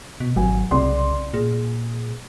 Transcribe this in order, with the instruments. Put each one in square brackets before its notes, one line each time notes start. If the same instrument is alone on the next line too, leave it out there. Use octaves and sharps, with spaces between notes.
[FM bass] B2
[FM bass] G#1 [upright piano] F#3 G#5
[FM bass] C2 [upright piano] C#3 D5 C6
[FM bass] A#2 [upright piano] G#4